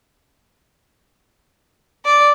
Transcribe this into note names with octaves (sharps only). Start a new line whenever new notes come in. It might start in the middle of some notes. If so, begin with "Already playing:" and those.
D5